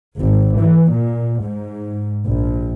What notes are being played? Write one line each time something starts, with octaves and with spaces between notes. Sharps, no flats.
G#1
E3
A#2
G#2
A#1